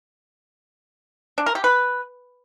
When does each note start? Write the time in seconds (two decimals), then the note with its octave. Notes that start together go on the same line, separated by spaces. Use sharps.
1.38 D4
1.46 A#4
1.55 G4
1.64 B4